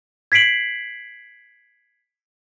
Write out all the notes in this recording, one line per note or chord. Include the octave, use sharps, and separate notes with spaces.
G#6 B6 C7 D7 F#7